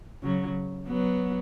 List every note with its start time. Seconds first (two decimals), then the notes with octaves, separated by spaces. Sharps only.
0.22 C#3 F#3
0.88 F#3 B3